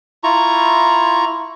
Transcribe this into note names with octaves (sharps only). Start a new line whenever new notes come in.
E4 F4 A#5 C#6